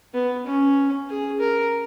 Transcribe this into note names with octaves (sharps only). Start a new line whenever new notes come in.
B3
C#4
G#4
A#4